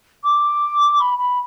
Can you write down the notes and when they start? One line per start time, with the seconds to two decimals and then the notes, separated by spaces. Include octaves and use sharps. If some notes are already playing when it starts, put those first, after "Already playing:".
0.24 D6
1.00 B5
1.19 B5